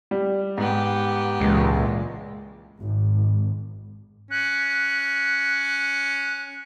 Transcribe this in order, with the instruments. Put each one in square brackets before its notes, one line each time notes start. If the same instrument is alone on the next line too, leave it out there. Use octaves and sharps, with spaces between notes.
[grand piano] G3
[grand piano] G#2 [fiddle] B3 G4
[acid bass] C#2 [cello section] A#2 E3 G#3
[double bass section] G#1
[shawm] C#4 [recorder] F#6